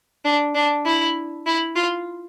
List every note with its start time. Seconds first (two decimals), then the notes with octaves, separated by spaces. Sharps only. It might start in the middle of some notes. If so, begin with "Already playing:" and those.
0.25 D4
0.55 D4
0.85 E4
1.46 E4
1.76 F4